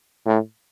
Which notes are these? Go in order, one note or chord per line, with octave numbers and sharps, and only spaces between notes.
A2